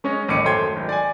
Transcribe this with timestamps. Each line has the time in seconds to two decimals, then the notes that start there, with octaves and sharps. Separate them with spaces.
0.04 G#3 C#4 C#5 D#5
0.28 A1 D#2 D6 C#7 D#7
0.44 F#2 A3 C5 G5 C6 G#6
0.76 G#1
0.89 D5 G#5